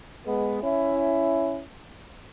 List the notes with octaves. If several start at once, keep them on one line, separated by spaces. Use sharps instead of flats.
G#3 B3
C#4 E4